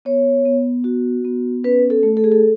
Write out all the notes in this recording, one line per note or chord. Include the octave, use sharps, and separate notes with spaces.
B3 C#5
B3
F#4
B3
C#4 B4
A4
A3
A4
G#4
A4